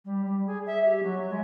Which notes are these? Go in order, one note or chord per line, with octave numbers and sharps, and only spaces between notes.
G3
G3
G#4
E5
G4
F#3
G#3